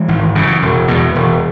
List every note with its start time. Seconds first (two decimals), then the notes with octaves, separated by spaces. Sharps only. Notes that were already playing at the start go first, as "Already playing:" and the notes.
Already playing: E3 G#3
0.08 G#1
0.35 F#2 C#3
0.62 E1
0.88 E2 B2
1.15 E1